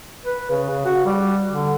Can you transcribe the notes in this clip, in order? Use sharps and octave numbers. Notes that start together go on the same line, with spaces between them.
B4
C#3
C#3
F#4
G3
D3